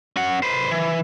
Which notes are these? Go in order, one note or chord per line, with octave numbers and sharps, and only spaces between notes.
C#4 F#5
B4 C5
E3